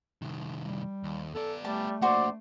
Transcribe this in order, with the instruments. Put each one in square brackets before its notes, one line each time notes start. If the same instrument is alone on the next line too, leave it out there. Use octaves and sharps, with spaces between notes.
[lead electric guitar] C2 D#3
[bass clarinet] G3
[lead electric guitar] D#2
[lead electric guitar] B3 D5 [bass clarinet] A4
[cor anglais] G3 [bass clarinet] A3 [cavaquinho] A5
[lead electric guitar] A#3 D4 [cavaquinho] F#4 C5 [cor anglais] D5